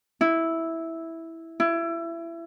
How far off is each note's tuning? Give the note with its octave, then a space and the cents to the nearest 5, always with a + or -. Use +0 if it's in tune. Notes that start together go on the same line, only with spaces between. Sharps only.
E4 -5
E4 +25